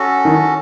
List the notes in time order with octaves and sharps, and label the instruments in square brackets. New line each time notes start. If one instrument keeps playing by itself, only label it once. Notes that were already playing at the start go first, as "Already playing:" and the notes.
Already playing: [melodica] C#4 F#4 A4
[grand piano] D#3